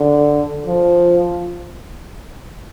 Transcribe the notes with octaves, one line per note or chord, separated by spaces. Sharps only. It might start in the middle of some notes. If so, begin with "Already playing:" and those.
Already playing: D3
F3